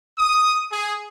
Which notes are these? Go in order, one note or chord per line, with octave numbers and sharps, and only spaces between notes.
D#6
G#4